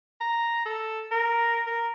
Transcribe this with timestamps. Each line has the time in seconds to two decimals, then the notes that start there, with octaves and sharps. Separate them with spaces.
0.21 A#5
0.66 A4
1.11 A#4
1.67 A#4